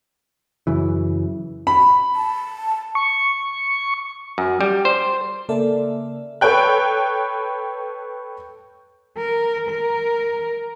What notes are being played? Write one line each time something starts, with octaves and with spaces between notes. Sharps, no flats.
F#2 C#3 E3
B5
A5
C#6
F#2
G3
C5
C#3 A#3 A4 A#4 D5 E5
A4 B4 C#5 G5 F#6
A#4
A#4